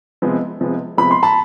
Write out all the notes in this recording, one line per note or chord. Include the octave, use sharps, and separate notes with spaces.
C3 F3 G#3 B3
C3 F3 G#3 B3
C3 F3 G#3 B3 B5
C6
A5 B5